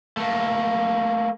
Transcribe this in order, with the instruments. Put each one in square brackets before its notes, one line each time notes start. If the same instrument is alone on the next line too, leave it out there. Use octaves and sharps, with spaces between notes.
[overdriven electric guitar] A3 A#3